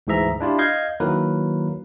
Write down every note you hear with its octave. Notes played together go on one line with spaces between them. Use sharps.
D2 G#2 E3 G#4 E5 A#5
D4 E4 F4 G4
D#5 F5 G6 G#6
D#3 F#3 A#3 E4 A#4 B4